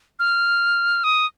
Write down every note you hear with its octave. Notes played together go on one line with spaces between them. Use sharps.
F6
D#6